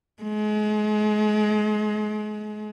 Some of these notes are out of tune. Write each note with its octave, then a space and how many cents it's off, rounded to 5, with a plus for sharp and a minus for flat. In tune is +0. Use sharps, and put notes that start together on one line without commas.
G#3 +35